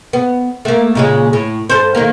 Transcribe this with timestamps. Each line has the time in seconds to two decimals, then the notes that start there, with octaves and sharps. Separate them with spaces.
0.13 B3
0.65 A3 A#3
0.95 A#2 C#3 G#3
1.33 A2
1.70 G2 A4 C5
1.95 D#3 A#3